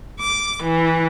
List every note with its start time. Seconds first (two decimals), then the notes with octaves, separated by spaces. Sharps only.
0.20 D6
0.62 E3